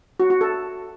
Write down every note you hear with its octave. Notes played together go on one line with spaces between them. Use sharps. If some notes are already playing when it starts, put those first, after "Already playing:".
F#4
F#4
A4